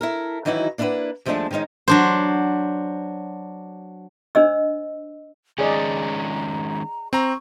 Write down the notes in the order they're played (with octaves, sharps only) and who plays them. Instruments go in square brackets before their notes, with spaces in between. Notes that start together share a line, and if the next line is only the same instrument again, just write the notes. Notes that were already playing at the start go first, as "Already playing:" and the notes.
[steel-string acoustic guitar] E4 A4 A#4
D#3 E3 F#3 D#4 E4 F#4
A#3 D4 E4 A#4 B4 F#5
D#2 F3 G#3 A3 D4 A5
D#3 F3 G#3 C#4 D#4
[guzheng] F#3 D4 C5
[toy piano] D4 C5 D#5 E6
[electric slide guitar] D#3 G#3 C#4 [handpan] G#4 D5 D#5 [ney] A#5
[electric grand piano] C4 A#5 [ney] C#6